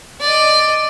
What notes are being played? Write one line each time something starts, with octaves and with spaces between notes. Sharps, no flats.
D5 D#5